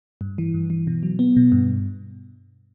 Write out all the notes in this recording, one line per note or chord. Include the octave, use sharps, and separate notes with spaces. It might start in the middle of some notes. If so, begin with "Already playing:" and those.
G2
E3
G2
E3
B2
F#3
B3
B2
G2